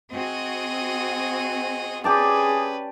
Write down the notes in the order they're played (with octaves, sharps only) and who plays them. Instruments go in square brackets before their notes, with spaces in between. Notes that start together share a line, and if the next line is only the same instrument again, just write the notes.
[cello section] C4 F#4 [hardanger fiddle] G#4 D#5
[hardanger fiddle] C#4 B4 [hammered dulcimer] G4 D5 A5 [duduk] G#4